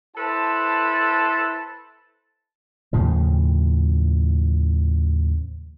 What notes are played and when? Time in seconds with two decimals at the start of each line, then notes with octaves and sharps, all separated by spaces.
0.16 E4 A4 B4 C5 A5
2.93 D#2 A2 C#3 F3